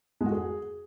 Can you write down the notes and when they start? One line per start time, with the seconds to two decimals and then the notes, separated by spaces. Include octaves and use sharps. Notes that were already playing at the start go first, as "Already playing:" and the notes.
0.21 G#3
0.26 F#4
0.32 G#4